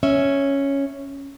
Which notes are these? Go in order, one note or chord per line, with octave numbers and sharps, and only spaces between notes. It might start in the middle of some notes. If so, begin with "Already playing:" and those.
C#4 E5